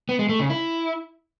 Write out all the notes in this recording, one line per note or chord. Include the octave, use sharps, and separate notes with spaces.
B3
G#3
A3
C#3
E4